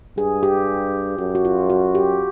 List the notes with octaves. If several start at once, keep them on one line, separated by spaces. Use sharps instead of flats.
G2 G#4
G4
F#2 F#4
F#4
F4
F#4
G4